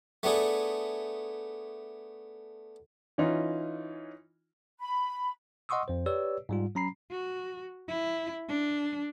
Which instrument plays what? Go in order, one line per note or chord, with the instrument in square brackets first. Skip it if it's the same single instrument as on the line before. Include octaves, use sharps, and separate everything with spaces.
[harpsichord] A3 B3 D4 G#4
[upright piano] E3 C#4 D#4 F4
[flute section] B5
[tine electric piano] D#5 F#5 C6 C#6 D#6 E6
F2 C5
G4 B4 C#5 D5 E6
G#2 G3 F4
F#3 C#4 A#5 B5 C7
[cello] F#4
E4
D4